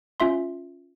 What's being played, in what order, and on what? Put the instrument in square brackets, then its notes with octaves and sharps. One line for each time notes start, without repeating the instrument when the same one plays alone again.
[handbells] C#4 F4 E5 C6